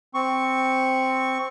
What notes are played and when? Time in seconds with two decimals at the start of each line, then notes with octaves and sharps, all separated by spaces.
0.14 C4 C#6